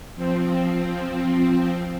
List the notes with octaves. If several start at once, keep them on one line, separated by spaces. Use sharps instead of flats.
F3 C4